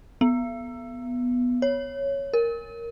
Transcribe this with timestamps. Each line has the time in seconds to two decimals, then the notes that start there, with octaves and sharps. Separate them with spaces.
0.21 B3
1.62 C#5
2.33 A#4